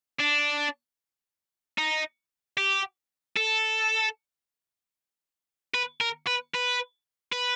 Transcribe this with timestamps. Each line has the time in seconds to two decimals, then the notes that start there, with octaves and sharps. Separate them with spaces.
0.19 D4
1.78 D#4
2.58 G4
3.36 A4
5.74 B4
6.01 A#4
6.27 B4
6.54 B4
7.32 B4